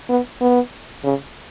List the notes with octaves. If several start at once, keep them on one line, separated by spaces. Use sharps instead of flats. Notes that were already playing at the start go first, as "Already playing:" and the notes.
B3
B3
C#3